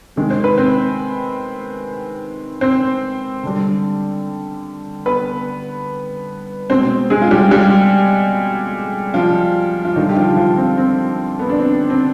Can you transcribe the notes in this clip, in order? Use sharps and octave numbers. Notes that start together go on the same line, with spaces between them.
C3 D#3 G#3
C5
B4
C4 C5
C4 C5
D3 G3
B3 B4
B2 G#3 C4 C5
G#3 G#4
F4
G3 G4
G3 G4
F3 F4
F4
D3 D#3 G3 D#4
G4
F3 F4
F3 F4
C4
C4
B3
D4
C4
C4